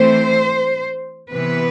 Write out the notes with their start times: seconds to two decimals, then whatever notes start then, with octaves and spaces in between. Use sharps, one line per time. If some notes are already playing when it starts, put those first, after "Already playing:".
Already playing: E3 A3 C4 C5
1.31 C3 E3 B3 B4